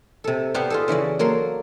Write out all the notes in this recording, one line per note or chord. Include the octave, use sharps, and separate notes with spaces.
C3 A4
B3 G4 D5 F5 F#5 A5
F4 G#4 A4
C#3 E3 F#4 D5
F#3 A#3 A4 C6